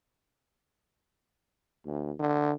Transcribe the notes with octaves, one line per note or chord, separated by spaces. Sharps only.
D2
D3